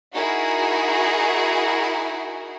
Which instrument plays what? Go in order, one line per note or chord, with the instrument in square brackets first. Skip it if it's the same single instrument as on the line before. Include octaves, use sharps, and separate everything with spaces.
[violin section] D#4 E4 F#4 G#4 A#4